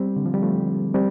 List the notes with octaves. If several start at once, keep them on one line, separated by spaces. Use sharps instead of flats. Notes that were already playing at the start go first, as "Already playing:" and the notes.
Already playing: G3 C4
D3
F3
G3
F3 A3
G3 C4